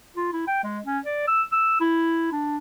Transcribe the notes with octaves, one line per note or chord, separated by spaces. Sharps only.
F4
E4
G5
G#3
C#4
D5
E6
E6
E4
D4